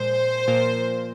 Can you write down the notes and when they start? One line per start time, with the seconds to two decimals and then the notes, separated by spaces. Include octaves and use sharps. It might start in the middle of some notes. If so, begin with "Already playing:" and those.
Already playing: A#2 F3 G#3 C5
0.48 A#2 F3 A#3 F4 A#4